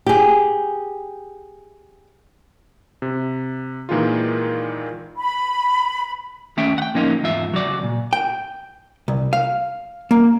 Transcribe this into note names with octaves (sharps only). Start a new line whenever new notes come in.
G4 G#4
C3
A#2 D#3 E3 G#3 D#4 F4
B5
D#2 A3 C#4 E5 G5
F#5 G5
A2 F3 A#3 C#4 D#4 F4
E2 G#2 F4 E5
C#2 F#3 F#4 D5
A#2
G5
C2
F5
A#3